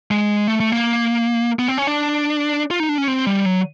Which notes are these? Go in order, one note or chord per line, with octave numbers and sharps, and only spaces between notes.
G#3
A3
A3
A#3
B3
C4
C#4
D4
F4
D#4
D4
C#4
C4
G3
F#3